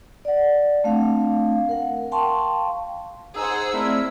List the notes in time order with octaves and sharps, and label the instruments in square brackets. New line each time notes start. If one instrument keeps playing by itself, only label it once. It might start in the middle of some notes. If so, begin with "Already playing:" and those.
[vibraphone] D5 F#5
A3 C4 D4 F5
A#4 F#5
F5 G5 A5 C6 C#6
[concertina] D#4 D#6 [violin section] G#4 C5 F#5 [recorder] E6
[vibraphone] A3 C4 D5 [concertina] E4 A#4 E5